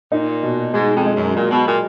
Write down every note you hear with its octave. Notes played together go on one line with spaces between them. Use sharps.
A#2 D#4
B2
G#2 G#3
F2
G#3
F#2
A#2 F#3
B2
A#2 F#3